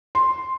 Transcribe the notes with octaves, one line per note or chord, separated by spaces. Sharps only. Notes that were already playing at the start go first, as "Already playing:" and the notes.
C6